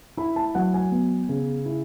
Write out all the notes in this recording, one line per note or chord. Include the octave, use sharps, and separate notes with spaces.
E4 B5
A5
F#3 F#5
G#5
B3
C#3
E4